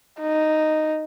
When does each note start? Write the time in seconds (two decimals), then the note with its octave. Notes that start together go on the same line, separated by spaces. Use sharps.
0.21 D#4